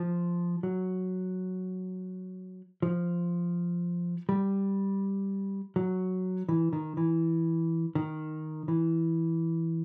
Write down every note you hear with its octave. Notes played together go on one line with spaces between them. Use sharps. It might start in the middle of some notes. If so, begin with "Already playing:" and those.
Already playing: F3
F#3
F3
G3
F#3
E3
D#3
E3
D#3
E3